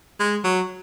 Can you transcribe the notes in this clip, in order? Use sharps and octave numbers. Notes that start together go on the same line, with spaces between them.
G#3
F#3